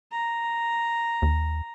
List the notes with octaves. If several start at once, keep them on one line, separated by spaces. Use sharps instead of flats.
A#5
D#2